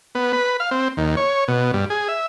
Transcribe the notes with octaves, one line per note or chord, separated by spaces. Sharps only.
B3
B4
F5
C4
D#2
C#5
B2
G2
G#4
E5